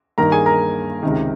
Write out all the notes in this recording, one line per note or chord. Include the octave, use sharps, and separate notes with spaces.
G2 D#3 A#3 A#4 A#5
G#4 G#5
A#4 A#5
C#2 C3 D#3